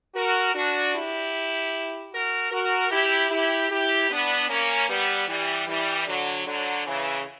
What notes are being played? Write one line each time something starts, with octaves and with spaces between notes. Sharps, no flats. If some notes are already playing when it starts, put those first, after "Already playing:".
F#4 A#4
D4 F#4
E4 G4
F#4 A#4
F#4 A#4
E4 G4
E4 G4
E4 G4
B3 D4
A#3 C#4
G3 B3
E3 G3
E3 G3
D3 F#3
D3 F#3
C#3 E3